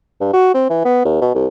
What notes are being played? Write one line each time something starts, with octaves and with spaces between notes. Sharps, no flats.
G2
F#4
C4
E3
B3
D#2
B2
C2